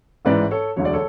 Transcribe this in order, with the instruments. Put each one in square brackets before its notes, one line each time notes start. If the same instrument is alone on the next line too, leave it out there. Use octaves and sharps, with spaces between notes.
[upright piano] A1 G#2 E3 B4 D5
A4 C#5
E1 D2 D3 F#3 C#5
D5
A4 C#5